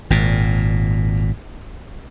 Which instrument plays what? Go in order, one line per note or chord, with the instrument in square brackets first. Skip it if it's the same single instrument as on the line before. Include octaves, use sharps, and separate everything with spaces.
[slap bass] G#1 A#2